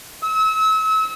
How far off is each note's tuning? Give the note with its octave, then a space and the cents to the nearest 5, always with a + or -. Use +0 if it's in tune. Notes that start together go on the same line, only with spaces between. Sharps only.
E6 -35